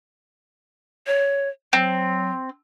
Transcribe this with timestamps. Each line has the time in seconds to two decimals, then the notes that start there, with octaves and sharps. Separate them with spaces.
1.07 C#5
1.73 F#3 C4